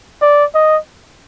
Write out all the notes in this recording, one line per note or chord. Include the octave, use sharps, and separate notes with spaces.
D5
D#5